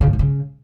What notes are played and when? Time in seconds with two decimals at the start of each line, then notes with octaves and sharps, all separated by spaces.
0.01 C#3
0.07 G#2
0.13 D3
0.19 C#3